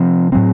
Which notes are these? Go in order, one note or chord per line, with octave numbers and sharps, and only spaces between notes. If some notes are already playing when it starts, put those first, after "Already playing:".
Already playing: C3 F3 C4
A2 F#3 C4